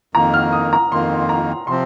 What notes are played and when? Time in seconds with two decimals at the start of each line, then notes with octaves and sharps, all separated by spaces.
0.15 F2 D#3 A#3 A#5
0.34 F6
0.52 D#6
0.73 A#5
0.91 F2 D#3 A#3 C6
1.29 A#5
1.67 C3 F3 C4 C6